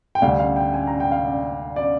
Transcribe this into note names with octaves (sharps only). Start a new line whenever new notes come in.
G5
D2 D3 G3 F5
F5
G5
G#5
A#5
G5
F5
D5
D5